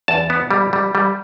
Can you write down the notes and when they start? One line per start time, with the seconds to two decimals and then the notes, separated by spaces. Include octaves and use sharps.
0.08 E2 A5
0.30 B3
0.51 G3
0.73 G3
0.95 G3